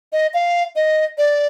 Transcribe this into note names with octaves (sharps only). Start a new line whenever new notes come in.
D#5
F5
D#5
D5